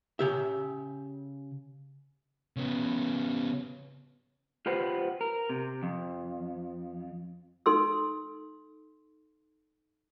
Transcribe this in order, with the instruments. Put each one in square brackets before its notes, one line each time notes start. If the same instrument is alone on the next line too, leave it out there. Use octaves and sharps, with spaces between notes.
[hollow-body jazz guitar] C#3 G4 E5
[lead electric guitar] C#3 B3
[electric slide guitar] F4 G4 B4 C5 F#5
A#4
C3
F2
[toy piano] D#4 A4 C6 E6